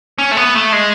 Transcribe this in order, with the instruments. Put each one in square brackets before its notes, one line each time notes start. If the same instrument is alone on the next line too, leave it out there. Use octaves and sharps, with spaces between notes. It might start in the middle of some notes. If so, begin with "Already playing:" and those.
[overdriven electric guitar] C#4
A3
B3
A3
G#3